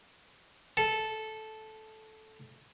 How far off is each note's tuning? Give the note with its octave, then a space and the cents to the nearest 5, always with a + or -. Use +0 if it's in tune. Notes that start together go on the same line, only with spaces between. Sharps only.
A4 -10